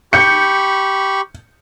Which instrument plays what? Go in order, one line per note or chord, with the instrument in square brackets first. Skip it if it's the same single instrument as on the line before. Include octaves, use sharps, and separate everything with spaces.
[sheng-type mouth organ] G4 B5 C#6 [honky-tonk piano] G6 C#7